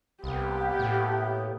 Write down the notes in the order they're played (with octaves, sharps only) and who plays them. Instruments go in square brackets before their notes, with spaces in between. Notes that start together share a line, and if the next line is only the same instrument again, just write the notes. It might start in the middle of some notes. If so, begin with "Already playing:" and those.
[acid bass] C2 [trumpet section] A#3 B3 [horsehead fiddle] G4
[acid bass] A2